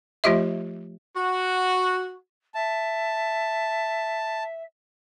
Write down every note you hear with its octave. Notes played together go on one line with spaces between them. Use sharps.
F3 A3 F4 G4 D#5 E5
F#4
E5 A5